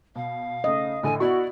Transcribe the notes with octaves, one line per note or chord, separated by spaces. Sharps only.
B2 F5
C#3 A3 D#5
A2 D3 A4 G#5
B3 E4 F#4 D5 C#6